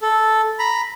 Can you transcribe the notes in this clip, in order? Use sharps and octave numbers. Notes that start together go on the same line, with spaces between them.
A4
A#5 B5